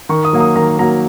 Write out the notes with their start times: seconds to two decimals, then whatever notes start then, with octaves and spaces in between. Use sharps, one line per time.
0.09 D#3 C#6
0.25 D#6
0.33 F#3 A#3
0.40 D#6
0.56 D#3 A#5
0.79 F#3 A#3 A#5